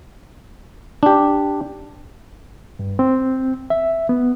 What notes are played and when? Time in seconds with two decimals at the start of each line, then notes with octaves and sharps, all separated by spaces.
1.03 D4 G4
2.79 G2
2.99 C4
3.70 E5
4.09 B3